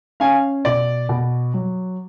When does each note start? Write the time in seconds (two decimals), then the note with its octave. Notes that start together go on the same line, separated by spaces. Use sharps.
0.20 C#4 F5 G#5
0.65 B2 D5
1.09 B2
1.54 F#3